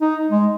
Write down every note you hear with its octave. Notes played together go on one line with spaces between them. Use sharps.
D#4
G#3